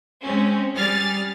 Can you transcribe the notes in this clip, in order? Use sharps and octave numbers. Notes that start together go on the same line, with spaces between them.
G#3 C4 C#4
G3 G#4 F6 A6